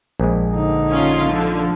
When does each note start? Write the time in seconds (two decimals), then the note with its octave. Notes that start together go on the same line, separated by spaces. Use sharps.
0.20 A#1 G#3
0.50 D3 D#4
0.89 C#4 F4
1.28 D3 F3